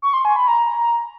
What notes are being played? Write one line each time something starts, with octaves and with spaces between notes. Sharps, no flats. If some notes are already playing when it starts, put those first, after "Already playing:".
C#6
C6
G#5
B5
A#5